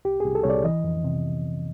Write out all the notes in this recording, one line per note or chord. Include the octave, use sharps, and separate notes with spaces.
C2 G4
C2 G#4
A4
C2 C#5
D5
E3 D#5
F2
C3